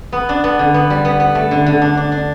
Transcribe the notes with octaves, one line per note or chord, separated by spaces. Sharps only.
B3
D4
B3
D3
B3
G3
B3
B3
A3
D3
D3
D4
D4
D4